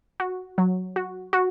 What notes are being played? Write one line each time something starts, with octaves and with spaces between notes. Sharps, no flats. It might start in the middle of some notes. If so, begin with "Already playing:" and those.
F#4
F#3
F#4
F#4